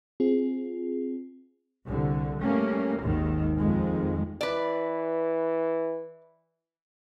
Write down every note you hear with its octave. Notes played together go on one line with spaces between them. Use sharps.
C4 F4 G#4
C2 D3
G3 A3 A#3 C#4
G#1 D#2 G#2 D#3
F2 D#3 G#3
E3 B4 D5